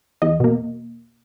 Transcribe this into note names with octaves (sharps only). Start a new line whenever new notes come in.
E2 D#5
B2 A#3